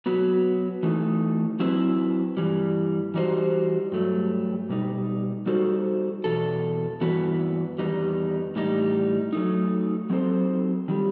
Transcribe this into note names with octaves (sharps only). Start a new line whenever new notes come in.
F#3 B3 F#4 B4
E3 A3 D#4
F#3 C4 E4 B4
G2 E3 G3
E3 G3 D#4 F#4 C5
G2 F#3 A3
B2 G3 D#4
G3 D#4 F#4 A4 C5
E2 B2 A4
G2 E3 B3 F#4 B4
E2 D#3 G3 B3 D#4
A2 E3 G3 D#4
F#3 A3 D#4
F#3 C4 D#4 A4 C5
D#3 G3